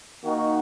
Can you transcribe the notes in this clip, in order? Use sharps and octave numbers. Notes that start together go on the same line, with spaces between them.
D#3 A#3 D#4 F#4